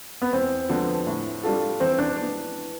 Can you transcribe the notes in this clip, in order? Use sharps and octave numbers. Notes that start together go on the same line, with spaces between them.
B3
E2 C4
D3 F3 B3 D4
A2
G3 D4 F4 A4
E3 C4
D4
D4
B3